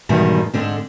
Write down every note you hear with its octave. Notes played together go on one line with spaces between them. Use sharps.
E2 G#2 B2 D#3 G3
G#2 D3 C4